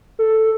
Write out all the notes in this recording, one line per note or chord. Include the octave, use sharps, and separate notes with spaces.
A4